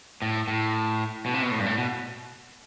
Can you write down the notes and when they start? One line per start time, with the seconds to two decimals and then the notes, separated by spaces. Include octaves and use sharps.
0.22 A2
0.48 A2
1.26 B2
1.34 C3
1.42 B2
1.51 A2
1.59 G2
1.66 A2
1.78 B2